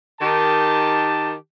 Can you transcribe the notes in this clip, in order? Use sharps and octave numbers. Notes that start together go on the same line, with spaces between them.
D#3 G4 A5